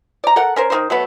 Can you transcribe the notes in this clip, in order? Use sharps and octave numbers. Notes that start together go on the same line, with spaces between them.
D5 A#5
A4 A#4 F#5
C#4 A#4 C5
D#3 D#4 A#4 C5
F#3 A3 B3